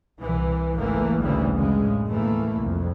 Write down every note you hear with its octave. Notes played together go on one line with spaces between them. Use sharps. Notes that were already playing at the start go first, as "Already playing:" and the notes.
C2 E3
G#1 C#2 E3 A3 A#3
A1 D2 C#3 E3 G3
F#2 A2 C#3 G#3
D#2 A2 E3 A3 A#3
C2 F2